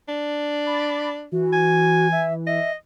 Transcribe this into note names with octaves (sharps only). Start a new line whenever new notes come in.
D4
B5 D6 A6
E3 F#4
G#5
E5
D#5 E5